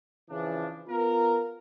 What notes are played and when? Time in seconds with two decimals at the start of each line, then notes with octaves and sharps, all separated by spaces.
0.30 C#3 E3 F3 D4
0.88 B3 F4 A#4